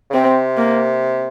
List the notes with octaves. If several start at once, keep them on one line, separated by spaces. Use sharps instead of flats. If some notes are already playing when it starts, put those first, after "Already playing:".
C#3
C3 C4
A#3